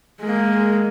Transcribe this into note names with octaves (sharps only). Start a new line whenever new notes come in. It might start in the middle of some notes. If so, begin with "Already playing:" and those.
G#3 A#3